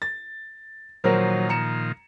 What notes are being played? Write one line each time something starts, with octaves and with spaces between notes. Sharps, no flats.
A6
A#2 D#3 F3 F#3 A#4 C5
A#5 C#7 E7